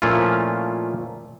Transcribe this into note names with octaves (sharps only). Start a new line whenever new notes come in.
A#2 F3 A3 C#4 E4 F4